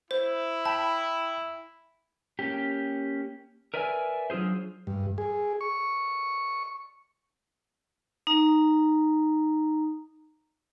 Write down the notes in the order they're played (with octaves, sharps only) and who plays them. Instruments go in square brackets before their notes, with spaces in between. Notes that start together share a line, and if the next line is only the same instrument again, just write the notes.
[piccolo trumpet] E4 [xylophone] C5
[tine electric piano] G5 B5 [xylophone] A5
[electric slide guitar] A#3 C#4 G4
A#4 B4 D5 E5 G5 G#5
F#3 D4 F4 G#4 C5
[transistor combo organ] G2
G#4
C#6
[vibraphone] D#4 A#5